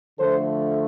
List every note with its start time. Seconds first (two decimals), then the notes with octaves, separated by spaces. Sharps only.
0.19 D3 F3 A3 A4 C5